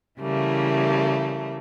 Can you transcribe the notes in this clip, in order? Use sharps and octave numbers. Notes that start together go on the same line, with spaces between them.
C#3 E3 G3 A3 A#3